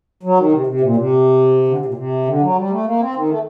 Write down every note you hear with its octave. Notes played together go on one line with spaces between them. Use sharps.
F#3
D#3
C3
C3
A#2
C3
D3
C3
A#2
C3
D3
F#3
G3
A3
A#3
C4
D#3
A3